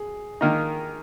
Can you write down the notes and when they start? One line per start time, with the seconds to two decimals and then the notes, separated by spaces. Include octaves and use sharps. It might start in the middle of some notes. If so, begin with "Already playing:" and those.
Already playing: G#4
0.41 D#3 A#3 D#4